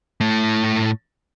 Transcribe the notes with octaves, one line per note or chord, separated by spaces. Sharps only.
A2 A3